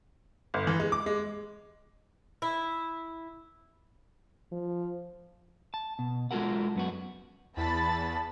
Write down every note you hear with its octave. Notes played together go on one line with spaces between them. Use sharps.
G1
E3
G#3
D6
G#3
E4
F3
A5
B2
G#3 F4 F#4 A4 A#4 F#5
F#2 B3 F#4
E2 A5 B5 A6